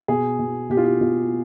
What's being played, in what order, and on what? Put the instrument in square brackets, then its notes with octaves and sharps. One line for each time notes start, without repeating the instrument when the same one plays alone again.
[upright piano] B2 G#4
B2
B2 G4
F4
G4
B2 F4